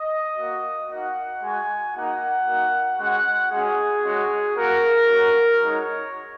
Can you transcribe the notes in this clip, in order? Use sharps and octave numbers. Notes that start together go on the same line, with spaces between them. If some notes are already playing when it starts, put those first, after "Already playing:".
Already playing: D#5
A#3 F#4
A#3 D#4 F#4 F#5
G#3 F#4 G#5
A#3 D#4 F#4 F#5
A#3 D#4 F#4
G#3 C#4 F#4 F#5
G#3 C#4 F#4 G#4
G#3 C#4 F#4
A#3 F#4 A#4
A#3 C#4 F#4
G#3 D#4 F#4 C#5